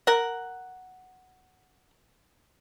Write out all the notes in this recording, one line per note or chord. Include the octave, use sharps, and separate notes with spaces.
A#4 F#5